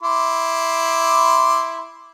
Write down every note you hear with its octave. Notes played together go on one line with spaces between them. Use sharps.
E4 C6 D6